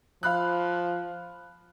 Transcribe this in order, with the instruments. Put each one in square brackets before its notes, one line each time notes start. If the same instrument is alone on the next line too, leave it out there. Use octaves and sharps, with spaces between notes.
[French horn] F3 [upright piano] F5 B5 F#6